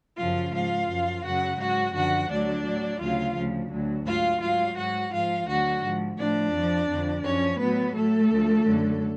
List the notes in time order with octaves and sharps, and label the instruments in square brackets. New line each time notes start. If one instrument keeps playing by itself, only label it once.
[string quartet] F#2 C#3 F3 F4 F5
G#2 F3 F4 F5
F#2 F3
F#2 C#3 F#3 F#4 F#5
G#2 F#3 F#4 F#5
F#2 D3 F3 F#4 F#5
D2 D3 F#3 D4 D5
A2 F#3
D2 C#3 F#3 F4 F5
D2 C#3 F3
D2 D3 F#3
G#2 F#3 F4 F5
G#2 F#3 F4 F5
G#2 F#3 F#4 F#5
G#2 F3 F4 F5
D2 D3 F#3 F#4 F#5
G#2 F3
A2 F3 D4 D5
F2 F3
F2 D3 F3
F#2 F3 C#4 C#5
A2 F#3 B3 B4
A2 F#3 A3 A4
D2 D3 F3
F#2 D3 F#3